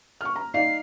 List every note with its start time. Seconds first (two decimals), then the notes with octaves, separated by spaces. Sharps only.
0.21 C#6 F6
0.36 A#5
0.54 D#4 D5 F5 C7